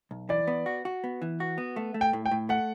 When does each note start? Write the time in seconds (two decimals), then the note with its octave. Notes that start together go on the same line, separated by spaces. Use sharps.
0.11 B1
0.29 E3 D5
0.48 B3
0.66 F#4
0.85 F#4
1.04 B3
1.22 E3
1.40 F#4
1.58 B3
1.76 A3
1.94 A3
2.01 G5
2.13 A2
2.26 G5
2.31 A2
2.49 A3 F#5